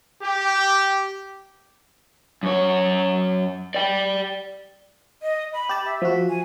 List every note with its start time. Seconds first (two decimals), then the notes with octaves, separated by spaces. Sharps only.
0.22 G4
2.43 F#2 C#5
3.74 D5 G5
5.22 D#5
5.54 B5
5.69 G4 A5
5.85 E5
6.02 F3 F#4
6.29 G#5